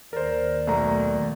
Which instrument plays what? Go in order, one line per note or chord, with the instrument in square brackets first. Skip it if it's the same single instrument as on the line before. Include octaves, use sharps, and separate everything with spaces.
[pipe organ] D#2 D#3 D5 [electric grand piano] A#4 C5
[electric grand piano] B1 A3 A#5